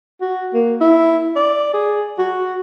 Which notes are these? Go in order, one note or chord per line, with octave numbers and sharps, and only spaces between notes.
F#4
A#3
E4
D5
G#4
F#4